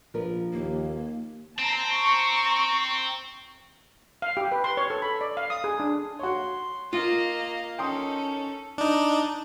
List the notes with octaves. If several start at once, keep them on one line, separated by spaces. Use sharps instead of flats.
A#1 F3 A#4 B4
D#2 A#3
C4 A5 A#5
A#5 C#6
F5
G4
B4
C6
C#5
A4
B5
D5
F5
D#6
G#4
D4
F#4 C#5 C6
A#3 F4 D#5 F5
C#4 D#4 A4 A#4 G5 C6 D#6
D4 D#4